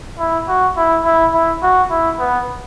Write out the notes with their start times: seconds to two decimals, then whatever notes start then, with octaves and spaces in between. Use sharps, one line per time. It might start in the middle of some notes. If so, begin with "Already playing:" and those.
0.19 E4
0.48 F#4
0.77 E4
1.05 E4
1.34 E4
1.63 F#4
1.90 E4
2.19 B3